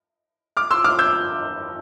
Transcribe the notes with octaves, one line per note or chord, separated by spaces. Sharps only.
D6 F6
C6 E6
D6 F6
E6 G6